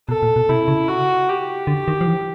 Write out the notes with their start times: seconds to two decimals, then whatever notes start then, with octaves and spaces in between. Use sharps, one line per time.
0.09 B2 A4
0.23 A#2
0.36 B2
0.49 C3 E4
0.68 C#3
0.88 F#4
1.28 G4
1.67 D3
1.88 D#3
2.01 F3
2.07 E3